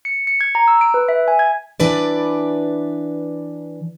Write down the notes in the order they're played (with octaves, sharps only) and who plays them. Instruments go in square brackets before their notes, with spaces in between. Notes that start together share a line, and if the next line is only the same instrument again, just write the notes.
[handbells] C#7
C#7
G#6
A#5
E6
D7
B4
E5
G#5
G#6
[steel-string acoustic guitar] E3 D4 B4 D5